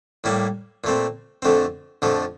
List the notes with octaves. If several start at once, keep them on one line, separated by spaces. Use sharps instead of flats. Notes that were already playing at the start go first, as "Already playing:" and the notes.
A2 G3 A#3 E4
A#2 A3 C4
F2 D3 A3 C4
F2 D3 F3 A3